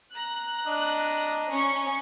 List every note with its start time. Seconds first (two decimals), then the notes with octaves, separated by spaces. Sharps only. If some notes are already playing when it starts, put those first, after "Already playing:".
0.15 A#5 F#6
0.67 D4 D#5
1.48 C#4 C#6